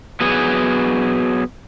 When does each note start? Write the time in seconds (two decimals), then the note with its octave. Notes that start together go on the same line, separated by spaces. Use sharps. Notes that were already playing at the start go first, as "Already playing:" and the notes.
0.21 F#3 B3 G#4